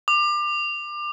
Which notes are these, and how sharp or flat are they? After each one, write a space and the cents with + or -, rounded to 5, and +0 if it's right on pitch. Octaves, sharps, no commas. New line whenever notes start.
D6 +30